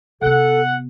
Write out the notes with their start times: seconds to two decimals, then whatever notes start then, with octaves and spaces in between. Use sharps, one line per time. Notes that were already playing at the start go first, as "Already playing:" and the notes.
0.21 C3 B3 A4 F#5